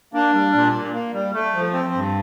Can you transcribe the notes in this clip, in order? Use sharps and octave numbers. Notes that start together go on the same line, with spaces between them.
A#3 D4
G3
A#2
A#2
A#3
G3
A3
F3
C4
G2